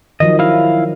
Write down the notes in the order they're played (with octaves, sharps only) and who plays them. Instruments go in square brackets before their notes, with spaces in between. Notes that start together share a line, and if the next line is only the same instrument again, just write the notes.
[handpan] D#3 F3 F#3 [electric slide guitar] D#5
[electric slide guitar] E4 F5